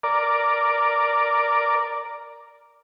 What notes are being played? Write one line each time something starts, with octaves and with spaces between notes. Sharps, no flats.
A#4 D5